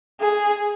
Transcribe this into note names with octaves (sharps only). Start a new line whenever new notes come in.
G#4